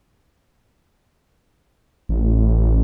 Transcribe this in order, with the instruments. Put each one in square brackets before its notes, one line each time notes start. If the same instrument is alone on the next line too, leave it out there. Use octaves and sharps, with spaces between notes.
[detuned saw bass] A1